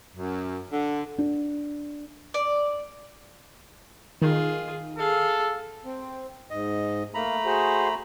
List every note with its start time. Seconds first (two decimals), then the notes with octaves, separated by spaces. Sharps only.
0.16 F#2
0.71 D3
1.18 D4
2.34 D5
4.22 D#3 F4 G#4
4.99 G#4 A4 F5
5.85 C4
6.50 G#2 D#5
7.14 A3 A#3 A#5 B5
7.46 F#4 G#4 C5